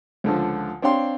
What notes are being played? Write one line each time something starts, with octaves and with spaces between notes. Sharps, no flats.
C#2 D3 F3
C4 D4 C#5 F5 G5 C6